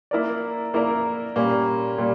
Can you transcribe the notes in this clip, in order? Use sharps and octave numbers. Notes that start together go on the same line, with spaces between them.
A#3 E4 A#4 D5
A#3 E4 A#4 D5
A#2 G3 A#3 C#4
A#2 G3